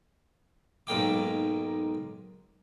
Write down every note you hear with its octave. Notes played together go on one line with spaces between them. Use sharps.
B1 G#2 A#3 G5 D6